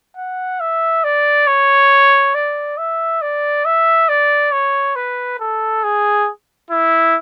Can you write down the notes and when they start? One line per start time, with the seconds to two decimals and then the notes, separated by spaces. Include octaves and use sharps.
0.17 F#5
0.60 E5
1.04 D5
1.47 C#5
2.35 D5
2.78 E5
3.22 D5
3.65 E5
4.09 D5
4.52 C#5
4.96 B4
5.40 A4
5.83 G#4
6.71 E4